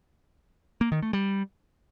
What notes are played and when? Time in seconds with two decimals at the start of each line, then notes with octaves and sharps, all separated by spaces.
0.81 A#3
0.92 D#3
1.02 A3
1.13 G3